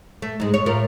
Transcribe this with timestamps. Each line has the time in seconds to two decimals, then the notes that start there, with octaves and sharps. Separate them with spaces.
0.22 A3
0.40 G#2 G#3
0.54 C#5
0.66 A2 F4 A#4